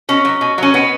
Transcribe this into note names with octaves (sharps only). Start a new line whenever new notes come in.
B2 C#4
F#3
B2
F#3 C#4
B2 B3